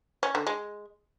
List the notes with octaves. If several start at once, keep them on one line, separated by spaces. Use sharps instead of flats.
C#4
D3
G#3